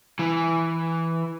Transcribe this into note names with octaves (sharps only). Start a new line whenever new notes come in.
E3